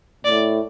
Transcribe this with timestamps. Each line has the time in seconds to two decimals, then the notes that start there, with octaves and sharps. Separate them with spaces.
0.25 A2 D5